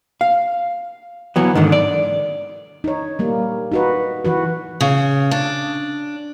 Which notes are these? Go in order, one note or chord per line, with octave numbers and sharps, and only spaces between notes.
F5
E3 F#3 B3
G#2 D3 D#3
D5
D#4 C#5
G3 A#3
D#4 F#4 B4
E3 F#4 B4
C#3
D4